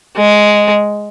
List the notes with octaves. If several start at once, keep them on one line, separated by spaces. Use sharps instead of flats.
G#3